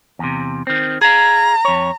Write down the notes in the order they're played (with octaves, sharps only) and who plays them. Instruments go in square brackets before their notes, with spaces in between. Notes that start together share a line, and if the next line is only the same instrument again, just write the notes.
[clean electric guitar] E2 C3
D#3 C4
[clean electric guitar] G#4 F5 [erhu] A#5
[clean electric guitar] F2 C#5